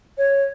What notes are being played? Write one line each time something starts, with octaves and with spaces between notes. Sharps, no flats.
C#5